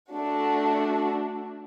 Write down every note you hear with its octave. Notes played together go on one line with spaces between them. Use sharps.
A3 D4 F#4